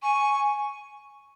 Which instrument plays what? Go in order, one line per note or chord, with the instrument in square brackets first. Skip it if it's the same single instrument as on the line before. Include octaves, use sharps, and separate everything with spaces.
[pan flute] G#5 [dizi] C#6